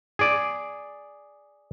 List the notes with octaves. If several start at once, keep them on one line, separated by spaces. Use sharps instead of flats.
G#4 D5